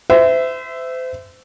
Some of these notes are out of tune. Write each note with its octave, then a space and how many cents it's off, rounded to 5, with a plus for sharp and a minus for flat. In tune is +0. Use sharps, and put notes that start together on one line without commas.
C5 -35 E5 +0